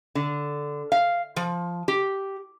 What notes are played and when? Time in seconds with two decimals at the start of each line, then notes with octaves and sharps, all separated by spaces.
0.15 D3
0.92 F5
1.36 F3
1.88 G4